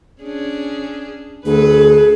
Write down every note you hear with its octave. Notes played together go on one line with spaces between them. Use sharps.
C#4 D4 G#4
D2 G#4 A4 B4